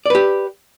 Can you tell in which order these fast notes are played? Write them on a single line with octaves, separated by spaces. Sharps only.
D5 B4 G4